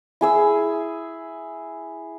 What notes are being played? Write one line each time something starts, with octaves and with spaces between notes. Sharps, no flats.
E4 G#4 E6